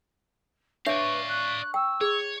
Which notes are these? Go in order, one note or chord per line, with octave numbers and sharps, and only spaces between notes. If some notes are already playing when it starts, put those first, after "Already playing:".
D4 B4 C#5 D5 E5 F5 C#6
F#6
G5 E6
G#4 C#5